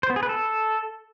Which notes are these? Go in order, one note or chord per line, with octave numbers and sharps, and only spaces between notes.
C5
B3
G#4
B4
A4